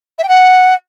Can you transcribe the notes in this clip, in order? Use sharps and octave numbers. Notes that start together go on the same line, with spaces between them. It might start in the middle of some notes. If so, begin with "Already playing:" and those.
E5
G5
F#5